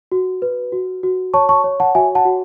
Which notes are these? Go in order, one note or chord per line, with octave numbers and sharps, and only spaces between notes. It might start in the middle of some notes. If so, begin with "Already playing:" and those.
F#4
B4
F#4
F#4
C#5 A5 C#6
A5 C#6
C#5
F#5 A5
F#4 E5 G#5
F#5 A5
F#4